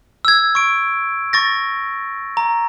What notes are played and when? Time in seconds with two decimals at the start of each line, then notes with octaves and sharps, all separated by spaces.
0.25 E6 G#6
0.55 C#6 D7
1.33 C#6 A6 A#6
2.37 A#5